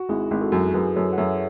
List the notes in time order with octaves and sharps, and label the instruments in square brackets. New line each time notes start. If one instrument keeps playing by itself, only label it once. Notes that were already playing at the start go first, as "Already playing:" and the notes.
Already playing: [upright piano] F#4
[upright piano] G#1 [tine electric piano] E4 G#4
[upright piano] G#1
[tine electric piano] F#4 A4
[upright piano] F#2
[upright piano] F#2 [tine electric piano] G#4 B4
[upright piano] F#2 [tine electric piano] A4 C#5
[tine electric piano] F#5
[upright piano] F#2 [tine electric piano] C#5 E5